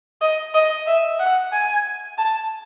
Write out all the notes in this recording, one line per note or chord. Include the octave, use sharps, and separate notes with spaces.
D#5
D#5
E5
F#5
G#5
A5